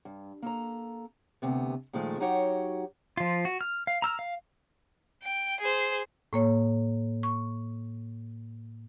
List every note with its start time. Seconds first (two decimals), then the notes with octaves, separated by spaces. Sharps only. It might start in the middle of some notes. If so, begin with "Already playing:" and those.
0.05 G2
0.42 A#3 A4 A#5
1.42 D2 C3 B3
1.93 A#2 D#3 F3 G#3 A3
2.20 F#3 D#4 F#4 G4 C#5 F#5
3.17 F3 F4
3.45 F#4
3.61 F6
3.87 F5
4.02 A#5 E6 F6
4.19 F5
5.23 G5
5.60 G#4 C5
6.33 A2 A#3 C#5
7.23 C#6